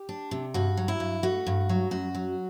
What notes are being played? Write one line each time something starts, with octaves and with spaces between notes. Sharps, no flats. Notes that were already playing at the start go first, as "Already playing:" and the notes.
Already playing: G4
D4
C3
G2 F#4
F#3
E4
G2
A3 F#4
G2
F#3
F#2 F#4
F#3